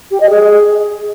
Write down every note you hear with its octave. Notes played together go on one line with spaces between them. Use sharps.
G4
D#5
G#4